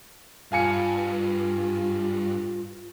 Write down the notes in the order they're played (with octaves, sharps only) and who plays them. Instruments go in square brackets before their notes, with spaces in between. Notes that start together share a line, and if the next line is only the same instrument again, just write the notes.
[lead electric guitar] G2 [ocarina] F4 [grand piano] F5 G#5 C#7